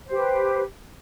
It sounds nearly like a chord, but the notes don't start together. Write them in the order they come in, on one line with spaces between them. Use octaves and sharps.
C5 G4 B4